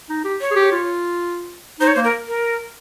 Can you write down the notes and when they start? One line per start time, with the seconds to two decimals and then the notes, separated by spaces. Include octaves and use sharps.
0.10 D#4
0.25 G4
0.41 C#5
0.51 G#4
0.56 G4
0.72 F4
1.80 D#4 C5
1.88 C#5
1.95 A#3 C5
2.04 A#4
2.28 A#4